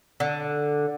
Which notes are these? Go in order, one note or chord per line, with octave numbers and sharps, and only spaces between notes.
D3